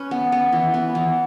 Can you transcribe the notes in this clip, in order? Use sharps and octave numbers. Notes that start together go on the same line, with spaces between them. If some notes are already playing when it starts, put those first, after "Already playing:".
Already playing: C#4 B4
B3
B3
E3
B3
E3